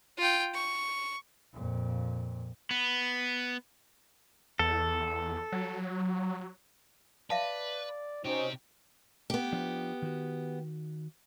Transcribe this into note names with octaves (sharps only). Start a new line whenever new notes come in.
F4 G5
C#6
F2 A#2
B3
E2 A4
F#3
B4 D5 E5 F5 A5
C3 C#4 D#4 F#4 G4 C5
B3 G4
F3 D4 F4
D#3 F#4